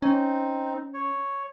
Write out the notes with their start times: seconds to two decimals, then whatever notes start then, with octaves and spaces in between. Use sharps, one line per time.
0.02 C4 C#4 D#4
0.94 C#5